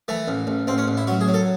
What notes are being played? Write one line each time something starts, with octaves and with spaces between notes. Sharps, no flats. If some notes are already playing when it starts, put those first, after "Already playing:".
E3 A3
A1
A1
A1 C4
C#4
A1
E4
F#3 F#4
G#4
F#3
A4